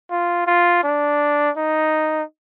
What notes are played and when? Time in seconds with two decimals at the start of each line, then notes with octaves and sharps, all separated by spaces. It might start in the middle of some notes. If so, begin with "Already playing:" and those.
0.11 F4
0.47 F4
0.84 D4
1.57 D#4